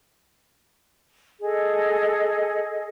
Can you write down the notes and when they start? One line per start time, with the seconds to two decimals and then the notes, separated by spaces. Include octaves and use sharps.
1.41 G#4 A4 D#5